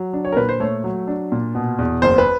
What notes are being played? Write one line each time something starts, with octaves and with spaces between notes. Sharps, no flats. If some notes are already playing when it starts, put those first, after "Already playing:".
Already playing: F#3
D4
C#5
A#4
A#2 B4
C5
A3 C#5
F#3
D4
A#2
B2
E2
F#1 C5
B4